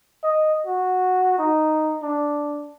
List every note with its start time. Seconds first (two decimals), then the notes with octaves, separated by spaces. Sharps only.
0.24 D#5
0.67 F#4
1.39 D#4
2.03 D4